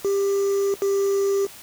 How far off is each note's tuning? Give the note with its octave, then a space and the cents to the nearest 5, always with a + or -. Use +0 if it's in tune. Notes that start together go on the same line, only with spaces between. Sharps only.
G4 +20
G4 +15